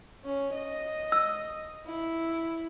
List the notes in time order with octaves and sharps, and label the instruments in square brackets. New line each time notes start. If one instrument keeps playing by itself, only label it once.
[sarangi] C#4
D#5
[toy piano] E6
[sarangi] E4